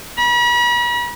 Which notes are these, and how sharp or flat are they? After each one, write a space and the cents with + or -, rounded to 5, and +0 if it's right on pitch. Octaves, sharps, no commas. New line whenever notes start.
B5 -45